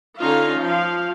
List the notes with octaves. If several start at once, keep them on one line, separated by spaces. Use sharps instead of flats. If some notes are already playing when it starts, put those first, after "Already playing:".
D3 C#4 D#4 F4 F5
F3 F5